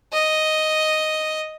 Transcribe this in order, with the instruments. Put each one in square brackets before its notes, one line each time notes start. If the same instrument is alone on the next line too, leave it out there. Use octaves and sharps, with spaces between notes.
[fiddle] D#5